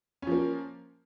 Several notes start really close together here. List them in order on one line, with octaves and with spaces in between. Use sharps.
C#4 F3 A#3